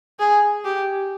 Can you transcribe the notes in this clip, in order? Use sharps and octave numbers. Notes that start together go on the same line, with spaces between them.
G#4
G4